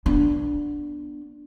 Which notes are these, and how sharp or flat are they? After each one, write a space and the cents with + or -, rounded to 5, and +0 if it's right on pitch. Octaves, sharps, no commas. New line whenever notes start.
B3 -15 D4 +0